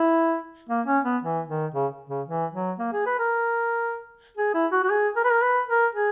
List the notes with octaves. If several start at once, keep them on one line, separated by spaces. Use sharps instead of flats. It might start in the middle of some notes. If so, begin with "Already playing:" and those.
Already playing: E4
A#3
C#4
B3
E3
D#3
C#3
C#3
E3
F#3
A#3
G#4
B4
A#4
G#4
E4
F#4
F#4
G#4
A#4
B4
A#4
B4
A#4
G#4